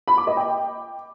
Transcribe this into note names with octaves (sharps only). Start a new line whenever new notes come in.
B5
D6
D#5
G5